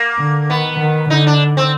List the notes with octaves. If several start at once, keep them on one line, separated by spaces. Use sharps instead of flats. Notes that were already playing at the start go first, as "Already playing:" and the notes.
Already playing: A#3
D3
D#3 B3
D#3
D3 D#4
D4
C4